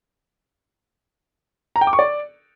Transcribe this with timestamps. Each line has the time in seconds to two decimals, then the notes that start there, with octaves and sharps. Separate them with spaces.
1.76 A#5
1.81 G5
1.87 D6
1.93 C#6
1.99 D5